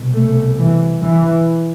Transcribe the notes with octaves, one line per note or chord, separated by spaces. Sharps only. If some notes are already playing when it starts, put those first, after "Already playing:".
Already playing: C2 B2
A3
E3
E3